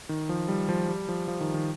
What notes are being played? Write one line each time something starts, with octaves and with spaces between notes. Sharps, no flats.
D#3
F3
G3
F3
G3
F3
F3
D#3
D#3